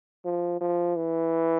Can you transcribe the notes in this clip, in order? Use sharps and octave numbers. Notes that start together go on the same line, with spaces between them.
F3
F3
E3